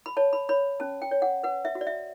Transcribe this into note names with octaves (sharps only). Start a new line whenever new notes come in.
B5
C#5 A5
B5
C#5 B5
C#4 A5
G5
C#5
F#5
B4 F#5
E5
F#4
D5
E5